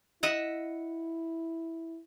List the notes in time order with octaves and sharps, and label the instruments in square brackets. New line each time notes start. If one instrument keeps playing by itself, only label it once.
[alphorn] E4 [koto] D#5 E5 F#5